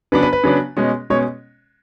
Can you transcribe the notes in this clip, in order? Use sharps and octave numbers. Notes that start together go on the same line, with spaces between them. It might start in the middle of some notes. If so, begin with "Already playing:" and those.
C#3 F#3 B3 D4 B4
B4
B4
C#3 F#3 B3 D4
B2 G#3 C#4
B2 G#3 C#4 C#5